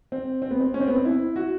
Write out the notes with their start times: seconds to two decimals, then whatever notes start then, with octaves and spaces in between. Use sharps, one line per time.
0.12 C4
0.42 C4
0.51 B3
0.60 C4
0.74 C#4
0.80 C4
0.88 B3
0.95 C4
1.05 E4
1.36 F#4